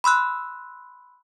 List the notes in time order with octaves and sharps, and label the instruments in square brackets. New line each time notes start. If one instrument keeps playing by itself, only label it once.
[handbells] B5 C6 E6 F#6